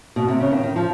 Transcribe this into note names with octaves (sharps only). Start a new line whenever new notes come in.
B2
C3
C#3
D#3
D#3
F3